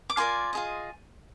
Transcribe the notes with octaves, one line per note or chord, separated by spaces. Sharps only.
D6
F4 A#4 D5 G#5 C6
F4 G#4 D#5